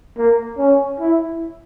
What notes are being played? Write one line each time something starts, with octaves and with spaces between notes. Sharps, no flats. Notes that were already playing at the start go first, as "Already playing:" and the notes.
A#3
C#4
E4